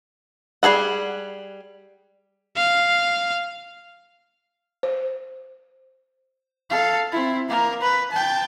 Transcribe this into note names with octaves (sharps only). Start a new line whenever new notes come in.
G3 G#4 A4 F#5
F5
C5
A4 F5
C4 E4
A#3 A#4
B4
G5 A5